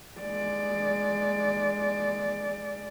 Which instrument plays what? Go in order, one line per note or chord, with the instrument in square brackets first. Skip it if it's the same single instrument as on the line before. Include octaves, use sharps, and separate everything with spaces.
[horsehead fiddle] G#3 D5